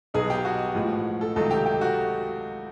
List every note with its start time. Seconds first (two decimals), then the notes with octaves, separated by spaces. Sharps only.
0.14 B1 B2 F#3 B3 D#4 G#4
0.30 G4
0.45 F#4
0.75 A1 A2 F3 G#3
1.21 A4
1.36 C#2 C3 D#3 F#3 A3 A4
1.51 G4
1.66 G4
1.81 F#4